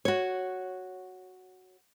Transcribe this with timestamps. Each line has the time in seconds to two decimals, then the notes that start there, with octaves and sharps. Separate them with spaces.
0.05 F#4 C#5